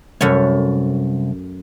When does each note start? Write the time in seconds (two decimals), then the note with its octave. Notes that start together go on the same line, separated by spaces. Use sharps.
0.21 C2 F#2 A3 C#5